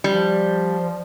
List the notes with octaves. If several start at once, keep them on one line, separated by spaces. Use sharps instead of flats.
F3 G3